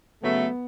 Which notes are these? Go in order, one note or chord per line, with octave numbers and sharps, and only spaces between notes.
C#3 F#3 A3 B3